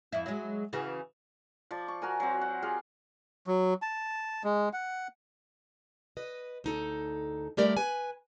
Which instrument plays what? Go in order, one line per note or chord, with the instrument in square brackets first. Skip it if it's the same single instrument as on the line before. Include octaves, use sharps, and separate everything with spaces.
[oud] F2 E4
F#3 G#3
C#3 E3 F#4
[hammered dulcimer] F3 D5
C#6
F#4 A#4 G#5
F#3 C4
F#5
F4 G4 G#4 F5
[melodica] F#3
A5
G#3
F#5
[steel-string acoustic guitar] B4 D#5
D2 D#4 A4
G3 A3 G4 A#4 D5
B4 G#5